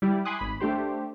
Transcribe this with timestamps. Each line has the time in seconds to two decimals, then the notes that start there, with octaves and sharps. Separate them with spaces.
0.02 G3 E4 D5
0.25 G#5 B5 C6 D6 D#6 F#6
0.39 G#1 B5
0.60 A3 D4 G4 C5